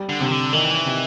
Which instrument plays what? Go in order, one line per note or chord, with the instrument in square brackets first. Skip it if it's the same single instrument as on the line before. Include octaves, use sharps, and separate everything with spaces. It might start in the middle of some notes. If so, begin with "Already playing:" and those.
Already playing: [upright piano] G3
[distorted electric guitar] D3
[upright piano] C3
[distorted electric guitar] D#3
D3
[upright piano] D#3 [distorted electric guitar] E3
[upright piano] C3